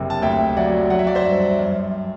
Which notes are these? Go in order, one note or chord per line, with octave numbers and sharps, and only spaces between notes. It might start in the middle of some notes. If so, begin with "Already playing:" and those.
Already playing: F#1 C3
A5
D2 E5 G5
F#3 D5 F#5
F#3 F#5
E5
D5
C5 E5
G2
F#2